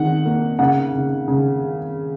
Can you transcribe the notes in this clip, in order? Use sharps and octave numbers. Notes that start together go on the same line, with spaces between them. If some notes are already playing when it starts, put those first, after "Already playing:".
Already playing: D#3 F#5
A#3
C#3 F#5
C#3
C#3